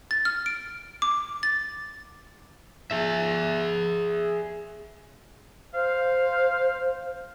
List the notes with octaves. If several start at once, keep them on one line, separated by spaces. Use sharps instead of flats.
A6
F6
D7
D6
A6
G#4 E5
C5 F5